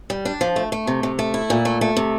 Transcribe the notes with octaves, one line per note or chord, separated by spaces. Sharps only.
G3
D4
F3
A3
A3
C3
C3
A3
E4
A#2
A3
A3
C3